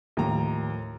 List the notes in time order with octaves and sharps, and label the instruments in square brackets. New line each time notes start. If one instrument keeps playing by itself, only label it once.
[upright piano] D#2 A#5 [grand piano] A2 F3